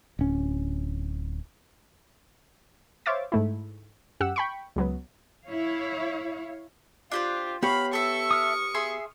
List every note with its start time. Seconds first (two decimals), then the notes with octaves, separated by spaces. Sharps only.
0.19 D1 C#4
3.06 C5 C#5 E5 F5 D6 A6
3.32 G#2 A3 E4
4.20 F#2 G4 F#5 E6
4.36 G5 B5 C#6
4.76 C#2 F#3 B3
5.45 E4 C#5 F5
7.11 D4 F4 G4 C5
7.63 B3 G4 C#5 F5 B5
7.93 A4 E5 C#6
8.31 D#6 F6
8.74 G#4 E5 C6